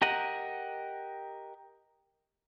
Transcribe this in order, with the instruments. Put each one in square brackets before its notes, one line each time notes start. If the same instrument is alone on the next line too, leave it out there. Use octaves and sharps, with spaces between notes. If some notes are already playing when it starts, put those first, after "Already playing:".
[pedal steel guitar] G4 A#4 D#5 F#5